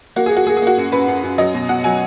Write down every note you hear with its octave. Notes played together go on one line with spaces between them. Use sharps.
A#3 F#4
G#4
A#3
F#4
A#3 G#4
G#4
A#3 F#4
F#2
F#2 B4
F#2
F#2
F#3 D#5
B2
B2 F#5
F#3 G#5